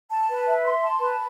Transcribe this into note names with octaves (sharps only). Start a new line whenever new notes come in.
A5
B4
E5
C6
A5
B4